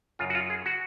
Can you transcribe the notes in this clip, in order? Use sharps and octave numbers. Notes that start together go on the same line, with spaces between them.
F#2 C#3 F4
F#4
F4
G#4
F#4